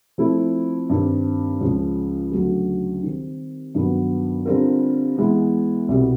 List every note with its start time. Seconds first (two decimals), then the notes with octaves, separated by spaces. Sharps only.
0.18 F3 A3 C4 E4
0.90 G2 D#3 G3 C4
1.61 C#2 C#3 F3
2.32 D2 C#3 F#3 A3
3.03 D#3 G3 C4
3.75 G2 D#3 F#3 B3
4.45 D3 G3 C4 F4 A#4
5.17 E3 G#3 B3
5.88 C2 B2 G3 B3